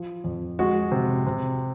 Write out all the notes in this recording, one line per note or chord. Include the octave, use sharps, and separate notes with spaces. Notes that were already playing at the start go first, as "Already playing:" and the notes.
Already playing: F3
F2
G#3 F#4
C3
C3